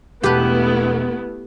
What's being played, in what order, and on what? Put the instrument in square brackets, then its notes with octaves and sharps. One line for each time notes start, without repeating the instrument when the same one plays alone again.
[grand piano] E1 [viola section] A3 B3 E4 [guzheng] G4 B4